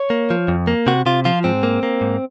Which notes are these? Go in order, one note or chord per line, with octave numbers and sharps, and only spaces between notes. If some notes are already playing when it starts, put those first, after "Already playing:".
Already playing: C#5
A#3
F3
F2
A#3
C3 F#4
C3 F4
F3 F4
G#2 C4
A#3
A#3
G#2